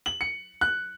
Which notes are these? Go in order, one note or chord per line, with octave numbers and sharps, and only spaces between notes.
F#7
C#7
F#6